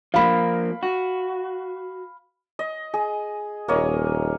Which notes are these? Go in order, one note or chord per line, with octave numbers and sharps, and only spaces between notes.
F3 A#3 F5 B5
F#4
D#5
G#4
D#1 A#3 C#5 D#5